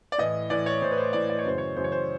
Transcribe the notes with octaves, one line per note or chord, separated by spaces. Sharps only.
D5
A2 E3 D#5
A2 E3 D5
C#5
A2 E3 C5
B4
C5
A2 E3 D5
D5
C#5
F#2 C#3 E3 C5
C#5
F#2 C#3 E3 C5
C#5
C5